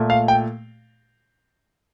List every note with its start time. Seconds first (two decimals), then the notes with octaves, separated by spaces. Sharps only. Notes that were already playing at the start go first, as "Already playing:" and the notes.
Already playing: A#2 A3
0.10 F5
0.28 G5